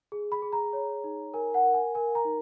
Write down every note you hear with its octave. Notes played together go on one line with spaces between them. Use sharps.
G#4
B5
G#4
A#5
C#5
D#4
A#4 G#5
F#5
A#4
G#5
A#4 G#5
A#5
D#4